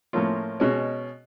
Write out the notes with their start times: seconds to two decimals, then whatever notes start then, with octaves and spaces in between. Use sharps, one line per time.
0.13 A2 F3 A#3 C#4 F4
0.60 B2 G#3 C#4